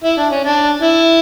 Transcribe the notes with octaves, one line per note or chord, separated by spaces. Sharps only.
E4
D4
C#4
D4
E4